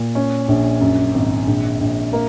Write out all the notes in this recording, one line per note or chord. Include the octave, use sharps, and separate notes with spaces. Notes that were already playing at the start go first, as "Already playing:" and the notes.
Already playing: A#2
C#4
A#1
F#2
G#1
A#1
A#1
A#3